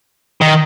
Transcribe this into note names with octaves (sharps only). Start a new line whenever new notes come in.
D#3